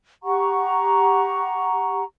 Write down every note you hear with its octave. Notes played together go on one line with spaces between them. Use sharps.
G4 F#5 A#5 C#6